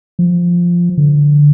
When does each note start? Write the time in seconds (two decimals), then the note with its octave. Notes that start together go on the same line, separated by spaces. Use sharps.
0.19 F3
0.97 D3